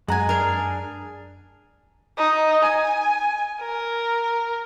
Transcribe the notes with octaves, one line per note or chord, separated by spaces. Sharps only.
F#2 G#3 F#5 G#5 A#5
D4 G#4 A#4 G#5
D#4
G#5
A#4